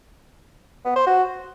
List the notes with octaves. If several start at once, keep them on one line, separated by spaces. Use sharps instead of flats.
B3
C5
F#4